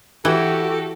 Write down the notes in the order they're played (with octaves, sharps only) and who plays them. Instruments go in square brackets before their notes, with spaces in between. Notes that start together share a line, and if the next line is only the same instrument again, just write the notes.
[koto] E3 [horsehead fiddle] F#4 G4 [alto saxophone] A4